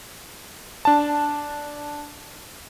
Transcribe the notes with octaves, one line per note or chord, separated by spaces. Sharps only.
D4 A5